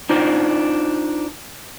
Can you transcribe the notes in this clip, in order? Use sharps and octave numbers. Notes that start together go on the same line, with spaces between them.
D4 D#4 F4 C5